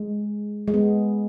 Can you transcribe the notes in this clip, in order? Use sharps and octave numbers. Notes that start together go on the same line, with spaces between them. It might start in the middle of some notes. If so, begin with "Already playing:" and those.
Already playing: G#3
G#3
B3